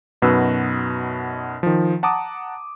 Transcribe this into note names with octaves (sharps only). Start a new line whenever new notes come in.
F#2 B2 D#4 F#4 B4 E6
D#3 F3
F#5 A5 A#5 D6 D#6